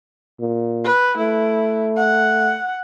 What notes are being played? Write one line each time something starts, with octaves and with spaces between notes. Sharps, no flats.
A#2
B4
A3 E4
F#5